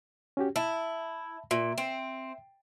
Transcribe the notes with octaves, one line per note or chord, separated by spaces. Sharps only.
C#4 F#4 G4
E4 E5 A5 B5
A#2 E5
C4